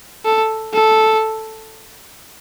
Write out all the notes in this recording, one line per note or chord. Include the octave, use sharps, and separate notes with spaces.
A4
A4